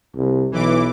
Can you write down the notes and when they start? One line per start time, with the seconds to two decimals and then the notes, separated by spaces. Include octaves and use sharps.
0.16 C2
0.52 B1 E3 D6